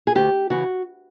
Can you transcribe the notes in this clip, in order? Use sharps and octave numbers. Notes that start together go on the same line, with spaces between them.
G#4
D2 G4
C#3 E3 F#4